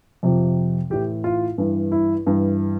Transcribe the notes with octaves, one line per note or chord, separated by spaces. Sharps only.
F2 C3 F3
A2 E3 G4
F4
G2 E3
E4
G2 E3